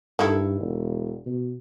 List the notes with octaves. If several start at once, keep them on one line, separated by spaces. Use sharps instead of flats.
G2 D#3 E4 A4
E1
B2